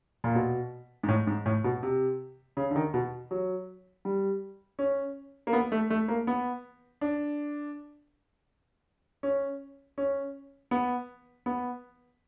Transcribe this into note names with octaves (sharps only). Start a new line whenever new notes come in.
A#2
B2
G#2
A2
G#2
A2
B2
C3
C#3
D3
D#3
B2
F#3
G3
C#4
A#3
B3
A3
A3
A#3
B3
D4
C#4
C#4
B3
B3